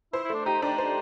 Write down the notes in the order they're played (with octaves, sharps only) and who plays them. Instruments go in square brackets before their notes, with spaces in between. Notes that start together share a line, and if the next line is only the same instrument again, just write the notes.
[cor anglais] E4 [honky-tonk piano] C5
[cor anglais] E4
[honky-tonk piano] A3 [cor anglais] D4
[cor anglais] D#4 [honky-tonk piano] G4
[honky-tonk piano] D4 [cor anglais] D#4
[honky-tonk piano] C5